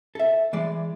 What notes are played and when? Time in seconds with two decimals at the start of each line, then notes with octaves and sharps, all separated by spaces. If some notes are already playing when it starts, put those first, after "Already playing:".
0.15 A4 E5
0.53 E3 G#3 D5